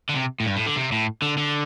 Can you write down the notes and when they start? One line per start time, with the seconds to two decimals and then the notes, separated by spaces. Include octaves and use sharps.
0.09 D3
0.15 C3
0.40 A2
0.46 G2
0.56 A2
0.66 D3
0.76 C3
0.92 A2
1.22 D3
1.38 D3